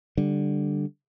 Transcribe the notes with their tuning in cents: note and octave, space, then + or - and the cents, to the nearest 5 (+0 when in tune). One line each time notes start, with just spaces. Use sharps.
D3 +0 G3 +0